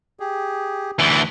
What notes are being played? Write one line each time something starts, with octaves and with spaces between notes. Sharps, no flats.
G4 G#4
D2 E3